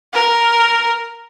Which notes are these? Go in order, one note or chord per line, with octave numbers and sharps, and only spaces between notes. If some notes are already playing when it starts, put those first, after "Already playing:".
A#4